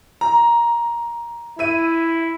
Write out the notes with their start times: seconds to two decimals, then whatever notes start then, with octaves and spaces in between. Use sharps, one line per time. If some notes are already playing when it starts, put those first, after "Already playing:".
0.21 A#5
1.59 E4 E5 D#7